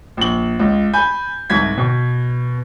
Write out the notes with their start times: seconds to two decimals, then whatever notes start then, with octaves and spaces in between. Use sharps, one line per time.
0.17 A#1 F#7
0.60 C#2
0.94 G#5 B5 G6
1.50 C2 G#2 G#6 B6
1.78 B2